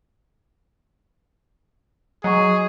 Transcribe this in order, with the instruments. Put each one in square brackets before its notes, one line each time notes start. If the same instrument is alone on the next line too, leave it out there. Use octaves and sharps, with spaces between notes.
[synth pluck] F#3 [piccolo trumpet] G#4 [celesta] D#5 A#5 C#6